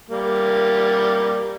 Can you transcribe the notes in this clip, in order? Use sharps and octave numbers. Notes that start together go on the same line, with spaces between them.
G3 A#3